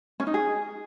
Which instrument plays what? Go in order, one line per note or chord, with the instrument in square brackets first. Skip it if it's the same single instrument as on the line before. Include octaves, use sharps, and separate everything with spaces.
[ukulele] C#4
D#4
G#4